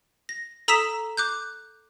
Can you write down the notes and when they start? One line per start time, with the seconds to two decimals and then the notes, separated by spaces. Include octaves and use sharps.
0.29 A#6
0.68 A4 A#5 D#6 E6 B6 E7
1.17 D6 F#6 G6